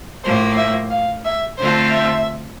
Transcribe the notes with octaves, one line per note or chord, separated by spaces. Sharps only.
A2 F3 A#3 C5
E5
F5
E5
D3 A3 C4 F4 A4 C5
E5